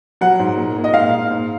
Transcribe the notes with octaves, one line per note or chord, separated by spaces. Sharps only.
F#3 F#5
G#2
A#2
A#2
D#5
G#2 F5
G#2
G#2